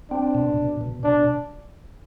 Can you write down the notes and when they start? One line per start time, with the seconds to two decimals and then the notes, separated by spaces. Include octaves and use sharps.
0.11 C4 D4
0.35 B2
0.58 B2
0.81 B2
1.03 B2 D4